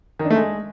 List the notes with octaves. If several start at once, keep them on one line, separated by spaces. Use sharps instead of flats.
D#3
D4
A3
G#3